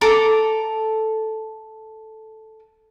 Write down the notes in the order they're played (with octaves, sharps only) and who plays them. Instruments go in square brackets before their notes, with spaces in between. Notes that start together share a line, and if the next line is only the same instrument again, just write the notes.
[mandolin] A4 A#5 D6